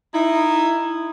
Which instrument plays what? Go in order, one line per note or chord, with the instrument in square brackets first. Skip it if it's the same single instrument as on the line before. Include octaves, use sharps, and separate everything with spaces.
[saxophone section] D#4 E4